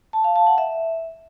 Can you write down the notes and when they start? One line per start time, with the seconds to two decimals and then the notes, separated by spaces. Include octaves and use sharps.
0.13 A5
0.24 F5
0.36 A5
0.47 F#5
0.58 E5